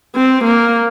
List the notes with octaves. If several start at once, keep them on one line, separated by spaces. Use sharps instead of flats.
C4
A#3